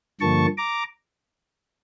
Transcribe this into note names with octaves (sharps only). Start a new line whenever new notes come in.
G2 D3 F3 A#3 A5 C#6
A#5 D6